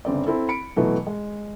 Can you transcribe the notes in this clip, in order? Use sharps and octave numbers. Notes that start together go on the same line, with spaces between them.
G1 C#3 C4 D5
C4 E4 A4
B5 C#7 D7
B2 E3 F#3 A3
G#3